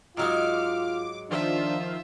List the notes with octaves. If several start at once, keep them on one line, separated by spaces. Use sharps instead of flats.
G#2 F#3 G#3 F4 D6 F6
D#3 F3 D4 F4 C5 E5